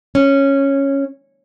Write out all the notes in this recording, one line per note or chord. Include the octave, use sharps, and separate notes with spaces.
C#4